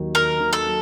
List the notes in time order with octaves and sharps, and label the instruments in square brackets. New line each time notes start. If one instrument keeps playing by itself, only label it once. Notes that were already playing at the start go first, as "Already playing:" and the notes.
Already playing: [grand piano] D#2 D#3 F#3
[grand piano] F#3 [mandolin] A#4
[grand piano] D#3
[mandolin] A4
[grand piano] F#3